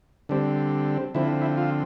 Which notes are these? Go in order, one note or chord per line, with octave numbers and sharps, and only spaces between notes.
D3 G3 C4
D3 F3 C4 E4
E4
F4